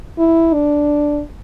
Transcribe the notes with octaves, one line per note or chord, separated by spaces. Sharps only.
E4
D4